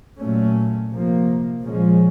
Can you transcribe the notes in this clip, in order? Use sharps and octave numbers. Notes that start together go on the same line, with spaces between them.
A#2 F#3 A3 C#4
C3 F3 A#3
A#2 F3 G#3 C#4